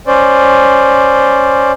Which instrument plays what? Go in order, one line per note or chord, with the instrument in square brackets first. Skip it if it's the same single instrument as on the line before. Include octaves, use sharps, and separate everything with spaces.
[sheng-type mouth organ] C#4 C5 D5